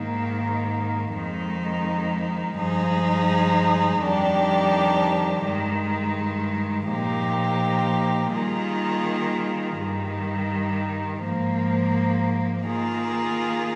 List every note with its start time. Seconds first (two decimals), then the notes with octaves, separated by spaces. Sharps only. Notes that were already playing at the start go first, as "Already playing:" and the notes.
Already playing: G#2 D#3 A#3
1.12 F2 D#3 G#3 D#4
2.56 G2 F3 G#3 D#4 G#4
4.00 F2 D#3 G3 D4 G4
5.44 G2 D#3 G#3
6.88 A#2 F3 A#3 D#4 G4
8.32 D#3 G3 A#3 F4 G#4
9.77 G2 D#3 G3
11.21 G#2 F3 A#3
12.65 D#3 A#3 F4 G#4